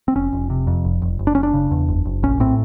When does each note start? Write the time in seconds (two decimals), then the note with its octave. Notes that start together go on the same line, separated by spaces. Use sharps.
0.08 C4
0.15 F1 C#4
0.33 F1
0.50 C3
0.67 F2
0.85 F1
1.02 F1
1.19 F#1
1.27 D4
1.35 F#1 C#4
1.43 D4
1.54 C#3
1.71 E2
1.88 F#1
2.05 F#1
2.23 A#1 C#4
2.40 A2 C4